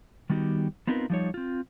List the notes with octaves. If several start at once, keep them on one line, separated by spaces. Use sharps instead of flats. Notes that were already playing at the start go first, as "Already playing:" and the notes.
D#3 G3 B3 D#4 F#4 G4
B3 C4 D#4 F4 A#4 B4
F3 G3 D#4 C#5
C4 F4